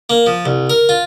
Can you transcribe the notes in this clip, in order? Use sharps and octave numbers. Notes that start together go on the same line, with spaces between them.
A#3
F3
C2
A#4
F4